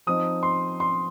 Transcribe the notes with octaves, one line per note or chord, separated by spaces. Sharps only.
F3 C4 D#4 D#6
C6
C6